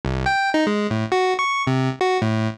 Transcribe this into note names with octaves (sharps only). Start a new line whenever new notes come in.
C2
G5
D#4
G#3
A2
F#4
C#6
C3
F#4
A2